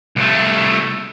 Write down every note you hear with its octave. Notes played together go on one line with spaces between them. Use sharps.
C2 A3